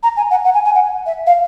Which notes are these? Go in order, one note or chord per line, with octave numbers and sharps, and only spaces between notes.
A#5
G#5
F#5
F#5
G#5
G#5
F#5
E5
F5